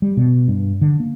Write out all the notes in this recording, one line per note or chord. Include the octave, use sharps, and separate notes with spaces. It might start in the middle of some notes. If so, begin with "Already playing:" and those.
G3
B2
G2
D3
A#3